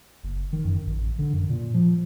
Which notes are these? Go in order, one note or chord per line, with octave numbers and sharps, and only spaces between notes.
F#1
D#3
F#2
A1
D3
F#2
A#2
F3